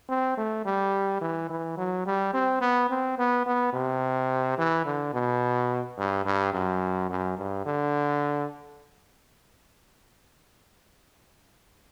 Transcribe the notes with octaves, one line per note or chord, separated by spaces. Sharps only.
C4
A3
G3
E3
E3
F#3
G3
C4
B3
C4
B3
B3
C3
E3
D3
B2
G2
G2
F#2
F#2
G2
D3